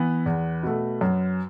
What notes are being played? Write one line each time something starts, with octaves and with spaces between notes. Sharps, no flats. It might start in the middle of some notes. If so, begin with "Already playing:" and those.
Already playing: E3 B3 B4
E2
B2 A3
F#2